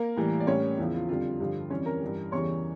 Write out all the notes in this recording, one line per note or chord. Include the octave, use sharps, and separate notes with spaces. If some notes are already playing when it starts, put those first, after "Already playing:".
Already playing: A#3 A#4
A2 E3 G3
D5
A2 G3 C#4 C#5
E2 C#3 F3 E4
F4
F2 D3 G3 F4
G2 D3 F3
F2 E3 G3 C#4 C#5
A#4 A#5
G2 E3 G3
E2 C#3 E3 G3 C#5 C#6